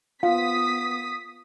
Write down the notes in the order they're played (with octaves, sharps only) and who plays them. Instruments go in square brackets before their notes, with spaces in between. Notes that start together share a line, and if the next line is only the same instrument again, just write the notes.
[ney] B3 [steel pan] F4 [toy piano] F5 [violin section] D#6 B6